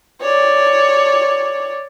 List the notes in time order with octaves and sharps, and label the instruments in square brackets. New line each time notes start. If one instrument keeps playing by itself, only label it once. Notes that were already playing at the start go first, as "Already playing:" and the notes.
[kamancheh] C#5 D5